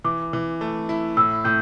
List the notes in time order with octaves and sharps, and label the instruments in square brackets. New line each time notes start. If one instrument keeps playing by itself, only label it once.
[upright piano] E3 [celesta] D6
[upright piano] E3
A3
E4
[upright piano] A2 [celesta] E6
[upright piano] A2 [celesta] G6